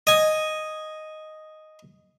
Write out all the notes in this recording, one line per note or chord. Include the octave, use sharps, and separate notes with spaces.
D#5 G#5